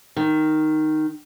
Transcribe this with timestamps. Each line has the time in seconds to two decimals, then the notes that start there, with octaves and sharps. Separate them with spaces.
0.16 D#3